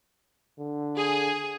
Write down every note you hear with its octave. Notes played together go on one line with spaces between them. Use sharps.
D3
G#4